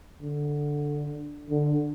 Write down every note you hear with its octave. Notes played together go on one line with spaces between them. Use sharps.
D3
D3